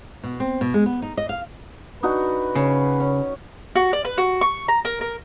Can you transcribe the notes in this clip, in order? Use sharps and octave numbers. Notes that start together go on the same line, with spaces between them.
B2
C4
B2
G#3
B3
D#4
D#5
F5
D4 D#4 F#4 B4
C#3 C#4
C#4
F#4
D5
B4
F#4
C#6
A#5
A#4
A#4